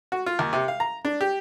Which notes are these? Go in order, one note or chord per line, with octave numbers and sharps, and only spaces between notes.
F#4
F4
D#2
C3
F5
A#5
D4
G4